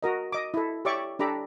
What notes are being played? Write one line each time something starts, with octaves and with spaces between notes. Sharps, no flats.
F#4 A#4 D#5
D#5 D6
E4 A4
G4 C#5 D5 E5 C#6 D6
D4 G4 A4 A#5 B5 D6